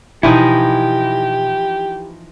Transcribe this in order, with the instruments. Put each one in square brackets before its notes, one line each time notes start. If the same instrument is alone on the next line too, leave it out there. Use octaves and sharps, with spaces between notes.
[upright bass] B2 B3 [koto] E3 F3 D#4 [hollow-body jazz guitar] E4 [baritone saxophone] G4